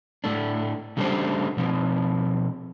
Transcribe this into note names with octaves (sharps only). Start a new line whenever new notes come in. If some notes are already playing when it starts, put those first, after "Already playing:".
A2 A3 D4
C#3 G3 A3 A#3 D4 C5
B2 F3 C4